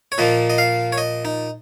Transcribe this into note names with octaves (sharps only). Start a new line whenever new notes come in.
C#5
A#2 F3 A#3 D#5
D#5
F5
C#5
D#5
D#4